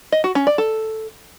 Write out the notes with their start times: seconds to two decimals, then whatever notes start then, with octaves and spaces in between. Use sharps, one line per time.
0.12 D#5
0.24 F#4
0.35 C#4
0.47 D5
0.58 A4